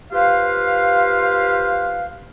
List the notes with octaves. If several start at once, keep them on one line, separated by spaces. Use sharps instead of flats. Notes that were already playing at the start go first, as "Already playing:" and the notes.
F4 G4 B4 C5 F5